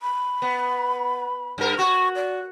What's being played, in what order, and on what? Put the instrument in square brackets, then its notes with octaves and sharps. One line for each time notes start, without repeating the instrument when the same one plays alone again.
[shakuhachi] B5
[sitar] B3
G2 A#4
[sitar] F#4 [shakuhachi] C#6
[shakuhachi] D5